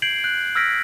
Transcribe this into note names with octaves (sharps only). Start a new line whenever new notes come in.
G6 G#6 C7 D7 F#7
F#6 G6
E6 F6 G#6 A#6 B6 D7